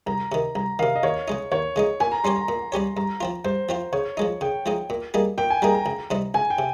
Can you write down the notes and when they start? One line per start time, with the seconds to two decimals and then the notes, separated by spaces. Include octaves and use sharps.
0.06 C2 A#5
0.32 C3 D#3
0.55 C2 A#5
0.79 C3 D#3 F5
0.95 D#5
1.03 D#2 C#5
1.28 C#3 G#3 D#4
1.52 D#2 C#5
1.76 C#3 G#3 D#4
2.00 A#2 G#5
2.12 A#5
2.24 G3 C#4 G4 C#5 C6
2.36 A#5
2.48 A#2
2.72 G3 C#4 G4 C#5
2.96 G2 A#5
3.21 F3 C4 F4
3.44 G2 C5
3.69 F3 C4 F4
3.93 C#3 C#5
4.17 F3 G#3 D#4
4.41 C#3 G5
4.66 F3 G#3 D#4
4.90 A#2
5.14 G3 A#3 D#4 G#4
5.38 A#2 G5
5.50 G#5
5.62 G3 A#3 D#4 G#4 A#5
5.75 A#5
5.86 C#2
6.11 C3 G3 C4 D#4
6.34 C#2 G#5
6.50 G5
6.59 C3